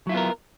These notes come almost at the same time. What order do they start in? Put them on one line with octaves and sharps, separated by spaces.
F#3 E4 F4 B3 A#4